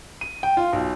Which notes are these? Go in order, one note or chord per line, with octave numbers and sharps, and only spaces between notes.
D#7
G5
F4
B1